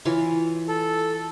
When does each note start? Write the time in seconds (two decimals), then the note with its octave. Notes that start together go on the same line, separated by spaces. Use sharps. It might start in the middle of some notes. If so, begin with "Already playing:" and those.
0.05 E3 F4 C#5
0.68 A4